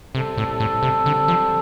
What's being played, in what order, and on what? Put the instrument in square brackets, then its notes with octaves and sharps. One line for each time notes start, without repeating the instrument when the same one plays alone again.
[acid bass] C3 [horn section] G3 C4 A4
[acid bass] A2
A2
C3
D3
F3